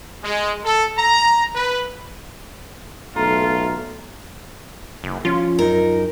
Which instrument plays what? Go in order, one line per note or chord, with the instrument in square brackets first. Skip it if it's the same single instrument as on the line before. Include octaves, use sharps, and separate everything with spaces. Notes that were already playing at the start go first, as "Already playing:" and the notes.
[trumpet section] G#3
A4
A#5
B4
[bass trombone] B1 [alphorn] A3 [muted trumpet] F4 [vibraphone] A#5
[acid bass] F#1
[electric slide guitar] F3 C#4 [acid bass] F4
[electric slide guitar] F#2 D#4 [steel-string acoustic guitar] A#4